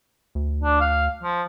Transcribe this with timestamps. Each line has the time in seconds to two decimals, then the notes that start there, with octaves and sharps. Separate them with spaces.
0.35 D2
0.63 D4
0.80 F5
1.23 F3